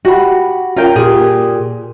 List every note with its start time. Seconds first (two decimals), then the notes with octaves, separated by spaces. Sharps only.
0.05 F#4 G4 B5
0.76 C#4 F4 A#4 G5
0.96 A#2 G4 G#4